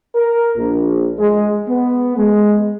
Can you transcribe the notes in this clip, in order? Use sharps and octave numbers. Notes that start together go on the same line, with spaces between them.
A#4
A#1
G#3
B3
G#3